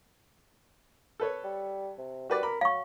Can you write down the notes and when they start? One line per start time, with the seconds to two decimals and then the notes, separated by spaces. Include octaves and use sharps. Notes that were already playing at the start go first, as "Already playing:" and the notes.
1.20 A4 B4 C#5
1.44 G3
1.98 C3
2.30 G3 F#4 B4 D5
2.43 A#4 B5
2.61 F#3 F5 C#6